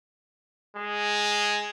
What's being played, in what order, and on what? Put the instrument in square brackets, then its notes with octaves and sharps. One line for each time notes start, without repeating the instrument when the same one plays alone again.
[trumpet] G#3